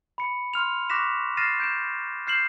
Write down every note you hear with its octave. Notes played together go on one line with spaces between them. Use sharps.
B5 C#7
C6 F6 F7
C#6 D6 F#6 A#6 B6 E7
F6 A6 A#6 C7 D#7 E7
G6 D7 E7
F6 G6 C7 E7 F#7